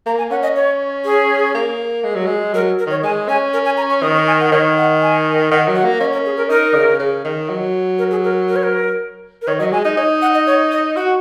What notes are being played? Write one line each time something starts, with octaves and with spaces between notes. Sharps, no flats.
A#3 A#5
G#5
C#4 F#5
D#5
C#5
G#4
A#3
G#3
F#3
G#3
F#3 A#4
A#4
D#3 C#5
G#3 G#5
C#4 G#5
A#4
G#5
A#5
C#6
D#3 D#6
C#6
G#5
F#5
D#3 C#5
F#5
G#5
D#3 F#5
F#3
F#5
A#3
C#4 D#5
A#4
G#4
A#4
D#4 A#4
C#3
C#3
D#3
F#3
A#4
G#4
A#4
A#4
C#5
A#4
A#4
D#3 C#5
F#3 D#5
G#3 G#5
D#4 D#5
D#4 C#5
F#5
D#5
C#5
D#5
F#4 F#5